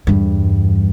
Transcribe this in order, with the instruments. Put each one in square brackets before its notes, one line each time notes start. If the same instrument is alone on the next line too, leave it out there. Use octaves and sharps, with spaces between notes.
[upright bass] E2 G2